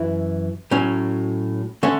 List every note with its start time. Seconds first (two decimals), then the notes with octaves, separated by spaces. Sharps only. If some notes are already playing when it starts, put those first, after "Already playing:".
Already playing: F#2 E3 E4
0.71 A2 F#3 C#4
1.83 D3 A3 C#4